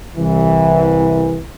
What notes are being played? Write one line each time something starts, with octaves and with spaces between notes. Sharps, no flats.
C2 E3